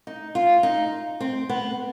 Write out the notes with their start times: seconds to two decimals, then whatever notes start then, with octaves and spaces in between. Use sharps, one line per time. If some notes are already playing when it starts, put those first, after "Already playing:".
0.07 D#4
0.35 F4
0.63 D#4
1.20 C4
1.49 B3